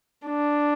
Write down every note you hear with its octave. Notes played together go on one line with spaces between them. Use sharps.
D4